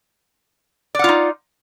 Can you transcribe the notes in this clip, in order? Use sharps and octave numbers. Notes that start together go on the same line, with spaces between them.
D#4 F4 D5 F#5